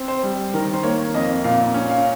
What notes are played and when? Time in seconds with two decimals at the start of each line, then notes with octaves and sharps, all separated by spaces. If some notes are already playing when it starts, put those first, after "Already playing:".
Already playing: C4
0.08 C5
0.23 G3
0.54 D#3 A#4
0.73 C5
0.83 A#3 C#5
1.14 F2 D#5
1.44 A#2 F5
1.74 C#4
1.90 F5